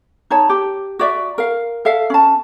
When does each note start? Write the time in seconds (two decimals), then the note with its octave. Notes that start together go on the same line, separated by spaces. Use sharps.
0.30 D#4 C#5 A5
0.49 G4
0.99 F#4 D5 E5
1.38 A#4 F5
1.85 A4 E5 F5
2.10 C#4 A5